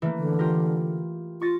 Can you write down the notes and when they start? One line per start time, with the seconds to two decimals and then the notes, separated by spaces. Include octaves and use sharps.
0.02 E3 A3 A#3
0.17 D3
0.39 F4 G4 A#4
1.41 F4 C#6 A6 A#6